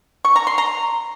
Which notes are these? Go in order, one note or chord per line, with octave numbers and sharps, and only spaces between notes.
C#6
A#5
C6
A#5